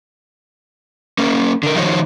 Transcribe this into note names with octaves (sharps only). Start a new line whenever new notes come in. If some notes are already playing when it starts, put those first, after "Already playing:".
A#3 C#4 A#4
D3 A#4
D#3 F3 D#4 F#4 C5 C#5